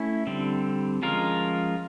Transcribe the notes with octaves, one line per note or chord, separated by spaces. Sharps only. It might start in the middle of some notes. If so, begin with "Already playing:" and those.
Already playing: A3 C#4 E4
D3 G3 C4
F3 G#3 C#4 F4 A#4